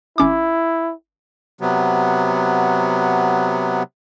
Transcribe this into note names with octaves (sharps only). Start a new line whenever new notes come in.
G#1 C#4 E4 D6
C3 F#3 B3